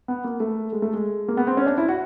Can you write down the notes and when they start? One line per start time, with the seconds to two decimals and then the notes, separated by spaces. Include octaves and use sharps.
0.08 B3
0.24 A#3
0.40 A3
0.72 G#3
0.82 A3
0.94 G#3
1.28 A#3
1.37 B3
1.47 C4
1.57 C#4
1.66 D4
1.78 E4
1.88 F#4